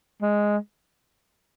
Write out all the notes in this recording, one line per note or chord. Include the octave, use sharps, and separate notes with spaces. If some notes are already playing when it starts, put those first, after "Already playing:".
G#3